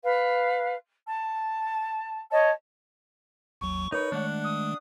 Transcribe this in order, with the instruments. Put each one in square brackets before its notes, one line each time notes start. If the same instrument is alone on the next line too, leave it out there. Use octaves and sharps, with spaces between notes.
[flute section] B4 F5
A5
C#5 D#5 A5
[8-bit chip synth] G#1 D#2 F#3 [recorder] C#6
[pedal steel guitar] D#4 [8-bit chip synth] A#4 B4 B5 [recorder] C#5
[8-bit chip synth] D#3 G#3 A3 [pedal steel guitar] D4 F#5
[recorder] D#6